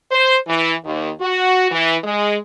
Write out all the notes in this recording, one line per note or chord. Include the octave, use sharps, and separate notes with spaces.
C5
E3
D#2
F#4
E3
G#3